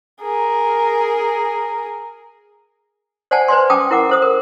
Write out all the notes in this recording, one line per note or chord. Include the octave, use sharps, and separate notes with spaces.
G#4 A#4
C5 D5 F#5 G#5 A5
B4 C5 D5 G#5 C6
C#4 G5 A5 D6 D#6
E4 A#4 F#5 D6
A4 C5 D#6
A#4